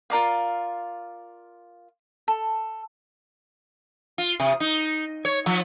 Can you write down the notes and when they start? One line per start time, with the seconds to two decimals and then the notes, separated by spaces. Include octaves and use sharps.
0.10 F4 A#4 D5 F5
2.28 A4
4.18 F4
4.40 C3
4.60 D#4
5.25 C#5
5.46 F3